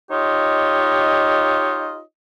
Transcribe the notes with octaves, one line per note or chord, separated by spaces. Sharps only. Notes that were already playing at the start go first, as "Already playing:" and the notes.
D#4 F4 G4 C#5 D#5